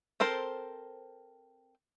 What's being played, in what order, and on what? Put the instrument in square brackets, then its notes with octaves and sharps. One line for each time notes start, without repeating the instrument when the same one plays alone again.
[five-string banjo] C4 A4 A#4 C5